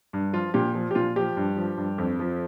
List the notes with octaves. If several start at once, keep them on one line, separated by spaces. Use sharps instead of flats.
G2
F3 F4
A#2 G4
F3
G4
A#2 F4
F3 G4
G2
F3
G2
F2
F3